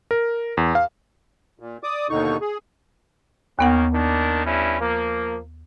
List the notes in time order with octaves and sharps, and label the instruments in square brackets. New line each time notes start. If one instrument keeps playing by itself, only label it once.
[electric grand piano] A#4
E2
F5
[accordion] A#2
D5 D6 D#6
D#2 B2 D3 D#4 C#6
G#4
[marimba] D#2 B3 F#5 [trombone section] D#3 A#3 C#4
[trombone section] D#3 A#3 D4
G2 C#4 E4
F3 A#3